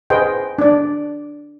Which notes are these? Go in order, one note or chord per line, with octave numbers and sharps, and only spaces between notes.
G#4 B4 C5 D#5 G5
D4 D5